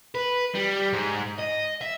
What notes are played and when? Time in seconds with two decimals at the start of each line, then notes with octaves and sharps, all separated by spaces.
0.15 B4
0.55 G3
0.93 G#2
1.38 D#5
1.81 E5